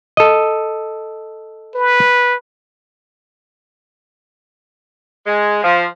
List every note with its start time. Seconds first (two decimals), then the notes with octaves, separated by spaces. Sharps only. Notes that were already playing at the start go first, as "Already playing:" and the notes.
0.17 A4 D#5
1.75 B4
5.25 G#3
5.62 F3